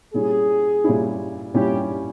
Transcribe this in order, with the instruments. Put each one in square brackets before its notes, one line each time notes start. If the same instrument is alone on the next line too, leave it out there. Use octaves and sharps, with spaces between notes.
[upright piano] A#2 G3 C#4 E4 [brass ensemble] G#4
[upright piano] A#2 G3 C#4 E4
[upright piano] A#2 G3 C#4 E4 [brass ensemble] G4